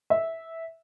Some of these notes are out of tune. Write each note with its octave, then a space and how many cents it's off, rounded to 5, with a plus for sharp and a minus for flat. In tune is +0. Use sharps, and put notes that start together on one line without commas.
E5 -10